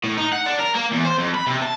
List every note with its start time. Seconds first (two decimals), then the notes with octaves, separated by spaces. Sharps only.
0.04 A2
0.18 D#4
0.32 F#5
0.46 D4
0.59 A#4
0.76 A#3
0.92 E2
1.06 C5
1.18 F2
1.35 B5
1.47 C3
1.62 A5